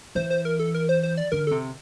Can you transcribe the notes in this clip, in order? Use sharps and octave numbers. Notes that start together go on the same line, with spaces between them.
E3 C5
C5
A#4
A4
A#4
C5
C5
D5
D3 A#4
C3 A4